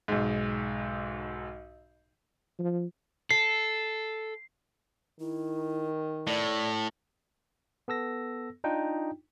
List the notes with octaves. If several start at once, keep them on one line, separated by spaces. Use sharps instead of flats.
B1 G#2
F3
A4 C7
D#3 E4
A2 D5
B3 A4 E6 A#6
D4 D#4 F4 G5